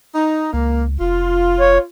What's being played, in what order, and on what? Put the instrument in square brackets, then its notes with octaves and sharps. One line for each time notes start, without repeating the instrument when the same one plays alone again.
[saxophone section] D#4
[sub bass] C#2 [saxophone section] A#3
[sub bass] F1 [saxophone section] F4
[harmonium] C#5